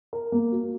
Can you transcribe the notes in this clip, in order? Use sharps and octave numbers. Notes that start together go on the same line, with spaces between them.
A#4
A#3
F#4